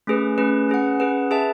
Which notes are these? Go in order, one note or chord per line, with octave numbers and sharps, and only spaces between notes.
A3 C#4 G#4 B4
A3 C#4 G#4 B4
C#4 G#4 B4 F#5
C#4 G#4 B4 F#5
G#4 B4 E5 A5